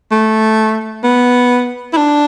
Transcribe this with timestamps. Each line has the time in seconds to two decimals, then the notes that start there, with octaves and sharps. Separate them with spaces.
0.11 A3
1.04 B3
1.93 E4
1.97 D4